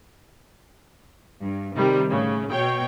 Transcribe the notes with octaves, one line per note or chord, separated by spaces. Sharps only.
G2
C3 D#3 G3
A2 C#3
B2 C#5 G5